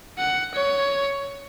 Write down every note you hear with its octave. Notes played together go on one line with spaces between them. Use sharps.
F#5
C#5